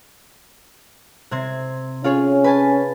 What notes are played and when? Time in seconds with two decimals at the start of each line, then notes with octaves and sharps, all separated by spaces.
1.31 C3 C4 G#6
2.04 C#4 F4 G#4 C#5
2.44 B4 G#5 A5